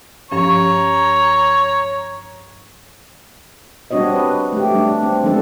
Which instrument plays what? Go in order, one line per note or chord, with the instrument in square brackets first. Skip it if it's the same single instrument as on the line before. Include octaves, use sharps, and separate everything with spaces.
[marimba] G2 F3 C#4 [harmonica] C#5 A#5 C#6
[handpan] G3 C4 D4 F#4 C#5 D#5
B4
A3 G4
G3 D4
C4
F3 G#3 B3 D4 A4